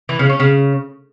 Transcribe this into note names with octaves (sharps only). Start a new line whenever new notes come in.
E3
C#3
C#4
C#3